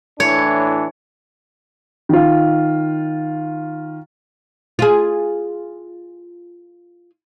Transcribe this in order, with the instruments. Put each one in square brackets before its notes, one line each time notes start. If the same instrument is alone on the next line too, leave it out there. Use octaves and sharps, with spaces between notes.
[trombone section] A2 E3 D4 [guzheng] C#5
[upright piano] D#3 F4
[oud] F4 G#4